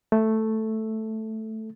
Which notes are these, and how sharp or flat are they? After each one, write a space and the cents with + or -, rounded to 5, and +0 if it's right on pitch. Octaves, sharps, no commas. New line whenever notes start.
A3 +0 A4 +0